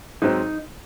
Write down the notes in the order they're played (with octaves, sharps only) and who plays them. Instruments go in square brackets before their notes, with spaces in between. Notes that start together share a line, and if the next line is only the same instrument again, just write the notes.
[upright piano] G#2 F#3 C4 [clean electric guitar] D#4